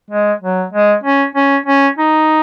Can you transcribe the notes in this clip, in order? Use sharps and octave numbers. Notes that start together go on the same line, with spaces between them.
G#3
F#3
G#3
C#4
C#4
C#4
D#4